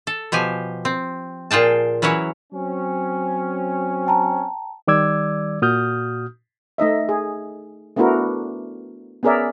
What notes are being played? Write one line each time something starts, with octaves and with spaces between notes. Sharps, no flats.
A4
B2 F3 G4 G#5
C4
A#2 F4 G#4 G5 A5
E3 F#3 C#4 E4 C#5
F#3 C4 C#4
G5 A5 A#5
D#3 G3 D5 D6 E6 G#6
A#2 F#4 D#6 F6 G6
A3 D#4 D#5 E5
G#4
A3 B3 D4 E4 F#4 A#4
B3 C#4 G#4 A#4 D5 E5